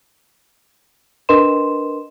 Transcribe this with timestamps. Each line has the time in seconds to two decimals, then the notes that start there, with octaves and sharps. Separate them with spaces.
1.29 D4 A#4 B4 D#5 C6 E7